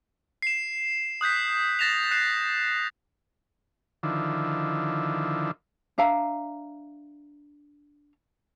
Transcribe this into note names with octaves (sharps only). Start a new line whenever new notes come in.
C7 E7
D#6 F#6 G6 B6
A6 A#6 E7 F7
F#6 C7 E7
D3 D#3 F3 E4
D4 E5 F5 A#5